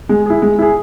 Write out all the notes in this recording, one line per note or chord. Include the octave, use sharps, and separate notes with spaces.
G#3
E4 G#4
G#3
E4 G#4